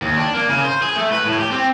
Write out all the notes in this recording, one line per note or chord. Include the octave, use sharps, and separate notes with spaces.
D#2
D4
A#3
C#3
C5
G#4
A3
B4
A2
G4
C4